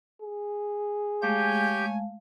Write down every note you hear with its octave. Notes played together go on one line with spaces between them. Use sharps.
G#4
G#3 A3 G4 C#5 F5 G#5 G6